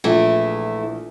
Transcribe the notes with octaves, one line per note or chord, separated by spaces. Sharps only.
A#1 E3 A3 E4